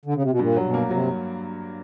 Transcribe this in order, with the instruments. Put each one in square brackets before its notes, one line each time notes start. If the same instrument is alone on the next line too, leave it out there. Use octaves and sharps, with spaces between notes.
[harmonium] D3
C#3
C3
B2
[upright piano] G2 [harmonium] A#2
[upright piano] F#3
[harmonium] B2
[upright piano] A#3
[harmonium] C3 [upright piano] F#3